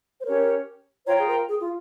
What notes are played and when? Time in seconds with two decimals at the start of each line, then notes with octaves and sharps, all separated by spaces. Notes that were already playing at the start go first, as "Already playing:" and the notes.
0.21 C5
0.25 C#4 G4 A#4 C#5
1.07 F4 C5 C#5 G5 A#5
1.19 G#4
1.27 A#4
1.49 G#4
1.61 F4